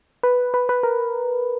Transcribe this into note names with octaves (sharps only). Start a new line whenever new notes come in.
B4
B4
B4
A#4